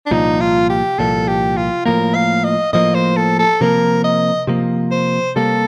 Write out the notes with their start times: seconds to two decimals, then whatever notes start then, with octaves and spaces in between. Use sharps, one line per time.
0.06 D4
0.11 C2 A#2 F3 D#4
0.40 F4
0.69 G4
0.99 C2 A#2 F3 A4
1.28 G4
1.57 F4
1.85 A2 F3 A#3 A#4
2.15 F5
2.44 D#5
2.73 A2 F3 A#3 D#5
2.95 C5
3.16 A4
3.39 A4
3.61 C3 F3 A#3 A#4
4.04 D#5
4.47 C3 F3 A#3
4.91 C5
5.36 C3 G3 A#3 A4